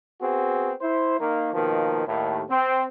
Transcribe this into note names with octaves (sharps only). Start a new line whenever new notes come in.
B3 C4 F#4 G#4
E4 C5
D#3 A#3
B2 D#3 F3 A#3
D#2 A2
C4